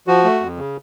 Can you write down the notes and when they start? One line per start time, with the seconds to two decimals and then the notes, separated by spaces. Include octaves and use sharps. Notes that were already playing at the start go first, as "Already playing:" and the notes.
0.07 F3 F#4
0.24 A3
0.40 F2
0.57 C#3